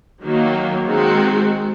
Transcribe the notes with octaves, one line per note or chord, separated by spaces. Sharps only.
D#3 F#3 A#3
D#3 G#3 C4 F#4